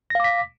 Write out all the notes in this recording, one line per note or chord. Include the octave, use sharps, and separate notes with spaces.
F5 D6 A#6 B6